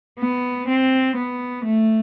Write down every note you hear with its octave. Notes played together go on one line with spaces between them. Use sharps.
B3
C4
B3
A3